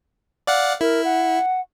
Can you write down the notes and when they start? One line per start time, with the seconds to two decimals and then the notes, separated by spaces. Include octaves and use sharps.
0.47 D5 F5 F#5
0.81 E4 A#4
1.05 F#5